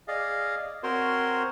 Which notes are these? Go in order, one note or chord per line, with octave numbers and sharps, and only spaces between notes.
G#4 D5 D#5 F5
C4 F#4 A#4 C5 C#5 C6